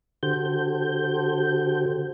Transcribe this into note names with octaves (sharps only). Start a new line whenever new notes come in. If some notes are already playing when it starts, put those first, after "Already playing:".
D3 F#4 G4 A4 C5 G6